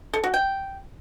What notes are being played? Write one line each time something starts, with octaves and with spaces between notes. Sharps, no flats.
A4
F#4
G5